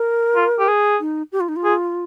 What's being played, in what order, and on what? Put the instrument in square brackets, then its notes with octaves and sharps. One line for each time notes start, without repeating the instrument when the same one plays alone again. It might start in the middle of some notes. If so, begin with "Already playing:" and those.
Already playing: [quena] A#4
[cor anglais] F4
G4
G#4
[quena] D#4
G4
F4
D#4
F4
[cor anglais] G#4